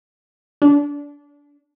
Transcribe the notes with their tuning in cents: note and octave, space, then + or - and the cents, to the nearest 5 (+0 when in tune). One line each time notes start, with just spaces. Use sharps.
D4 -25